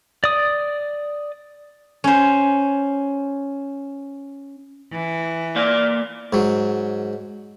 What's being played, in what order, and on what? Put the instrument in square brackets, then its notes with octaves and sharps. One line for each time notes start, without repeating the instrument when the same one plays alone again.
[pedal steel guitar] D5 D#6
[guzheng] C#4 C5
[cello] E3
[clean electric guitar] A#3 D5 F5
[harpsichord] G#2 F#3